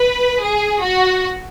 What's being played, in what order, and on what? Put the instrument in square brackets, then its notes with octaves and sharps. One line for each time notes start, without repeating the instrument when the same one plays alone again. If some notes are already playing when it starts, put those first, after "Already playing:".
Already playing: [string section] B4
G#4
F#4